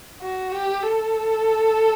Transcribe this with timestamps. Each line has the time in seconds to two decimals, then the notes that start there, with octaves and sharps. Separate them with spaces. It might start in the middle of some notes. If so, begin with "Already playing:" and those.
0.21 F#4
0.52 G4
0.82 A4